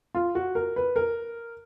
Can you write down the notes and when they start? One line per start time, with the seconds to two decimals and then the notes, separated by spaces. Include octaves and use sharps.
0.15 F4
0.35 F#4
0.55 A#4
0.76 B4
0.96 A#4